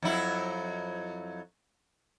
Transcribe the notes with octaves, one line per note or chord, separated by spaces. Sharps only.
F2 F#3 E4